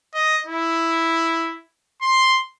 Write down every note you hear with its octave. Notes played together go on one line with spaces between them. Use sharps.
D#5
E4
C6